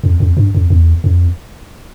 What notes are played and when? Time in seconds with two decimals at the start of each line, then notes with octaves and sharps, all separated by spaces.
0.04 F2
0.20 F2
0.37 G2
0.55 F2
0.70 E2
1.04 F2